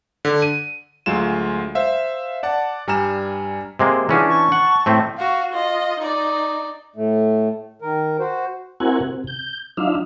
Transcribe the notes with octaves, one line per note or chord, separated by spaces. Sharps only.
D3
D#7
D2 F#3 G#3 F4 E7
C5 E5 F5
D5 F#5 A5
G2 G3 G#5 A#5 F6 E7
C3 G#3 A#3
E3 C#4 D4 F4 F#4 G#4
A5 C#6
F#5
A2 A3 C4
F#4 F5
F4 D#5
D#4 D5
A2 A3
D#3 A#4
F#4 C5
C4 E4 F#4 A#4 F#5 G#5
C3
G6
F#3 D4 D#4 F4 E5 F5